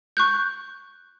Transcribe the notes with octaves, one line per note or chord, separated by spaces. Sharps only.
C#6 F#6 G6